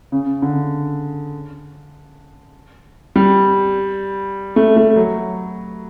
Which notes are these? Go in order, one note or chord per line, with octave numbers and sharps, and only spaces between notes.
C#3
D3
G3
A3
A3
F#3